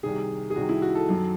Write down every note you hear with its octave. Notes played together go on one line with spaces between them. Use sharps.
C2 C3 D#3 G#4
G#4
C2 C3 D#3 F#4
E4
F#4
A4
F#2 D#3 F#3